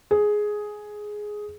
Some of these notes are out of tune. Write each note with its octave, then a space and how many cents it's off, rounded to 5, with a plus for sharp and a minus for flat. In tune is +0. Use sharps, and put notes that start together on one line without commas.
G#4 +5